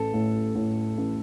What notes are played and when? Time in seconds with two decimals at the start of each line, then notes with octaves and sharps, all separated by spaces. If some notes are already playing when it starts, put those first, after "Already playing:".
Already playing: A1 A4
0.14 A2
0.55 A2
0.98 A1